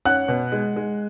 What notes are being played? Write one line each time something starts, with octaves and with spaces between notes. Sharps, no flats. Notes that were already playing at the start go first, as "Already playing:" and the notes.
C#4 F#5 F#6
B2
G#3
G#3